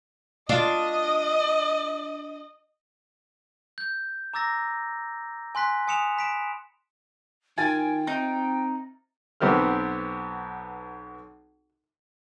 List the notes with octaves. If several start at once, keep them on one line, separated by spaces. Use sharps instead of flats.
D4 F4 D#5
G6
A#5 D6 E6 A6 A#6
G#5 C6 F#6 B6
G#5 D#6 C#7 E7 F7
B5 B6 D7 E7
D#3 F4 G5 G#5 A6
C4 D#4
B1 B3 C4 G4 F6